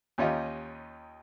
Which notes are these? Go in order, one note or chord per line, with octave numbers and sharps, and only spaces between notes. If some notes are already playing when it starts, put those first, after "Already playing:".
D#2 C#4 D#4 F4 G4 D#5